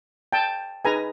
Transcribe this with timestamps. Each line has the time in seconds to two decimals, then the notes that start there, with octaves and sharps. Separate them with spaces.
0.32 G5 A5
0.85 D#4 G#4 B4 G#5 A#5